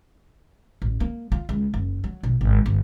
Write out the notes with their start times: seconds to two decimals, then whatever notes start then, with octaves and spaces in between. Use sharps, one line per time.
0.82 A1
1.00 A#3
1.32 F4
1.49 C#2
1.74 F#1
2.04 F#3
2.23 B1
2.41 G#1
2.66 G1